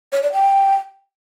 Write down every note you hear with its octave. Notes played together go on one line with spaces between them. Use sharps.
C#5
D5
G5